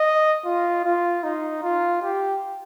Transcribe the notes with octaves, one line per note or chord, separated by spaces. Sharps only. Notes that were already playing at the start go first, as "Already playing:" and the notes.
Already playing: D#5
F4
F4
D#4
F4
G4